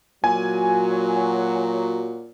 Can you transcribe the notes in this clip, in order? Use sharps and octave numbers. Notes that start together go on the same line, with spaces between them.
A#2 F#3 G#5